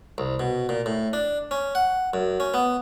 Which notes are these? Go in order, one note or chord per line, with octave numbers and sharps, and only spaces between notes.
C2
B2
A#2
A2
D4
C#4
F#5
F#2
C#4
B3